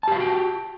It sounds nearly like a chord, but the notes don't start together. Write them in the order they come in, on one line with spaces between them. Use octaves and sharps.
A5 G4 F5 F#4 G5